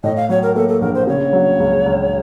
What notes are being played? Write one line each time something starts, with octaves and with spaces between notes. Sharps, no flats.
A2 D#5
F5
F#3 C#5
A#4
A#3 A4
A4
A#1 A#4
C5
C#3 C#5
F#3
C#2
C#2